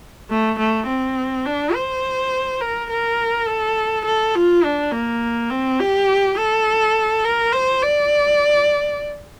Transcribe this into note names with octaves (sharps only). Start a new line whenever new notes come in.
A3
A3
C4
D4
C5
A#4
A#4
A4
A4
F4
D4
A#3
C4
G4
A4
A#4
C5
D5